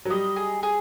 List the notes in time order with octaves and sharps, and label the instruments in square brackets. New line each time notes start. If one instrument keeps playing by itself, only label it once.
[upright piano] F#3
[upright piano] G3 [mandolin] D#5
[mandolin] G#4
G#4